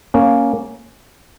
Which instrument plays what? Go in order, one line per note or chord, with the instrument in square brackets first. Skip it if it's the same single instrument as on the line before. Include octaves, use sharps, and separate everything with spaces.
[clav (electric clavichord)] A#3 C#4